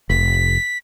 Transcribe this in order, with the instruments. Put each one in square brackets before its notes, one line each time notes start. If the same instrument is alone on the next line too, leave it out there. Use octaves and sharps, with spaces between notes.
[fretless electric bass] F1 [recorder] B6